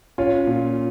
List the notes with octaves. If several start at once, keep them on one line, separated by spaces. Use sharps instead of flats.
C#4 F4
A#2